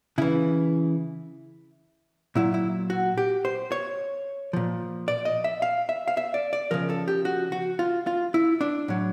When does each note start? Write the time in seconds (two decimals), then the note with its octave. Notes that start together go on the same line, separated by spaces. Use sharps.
0.18 C#3 E3 E4
2.35 A#2 F#3 E4
2.54 E4
2.90 F#4
3.18 G4
3.45 C5
3.72 C#5
4.53 A#2 F3
5.08 D5
5.25 D#5
5.44 E5
5.62 F5
5.89 E5
6.08 F5
6.17 E5
6.34 D5
6.53 D5
6.71 C#3 F3 A#4
6.90 A4
7.08 G4
7.25 F#4
7.52 F#4
7.79 F4
8.07 F4
8.34 E4
8.61 D4
8.88 A2 F#3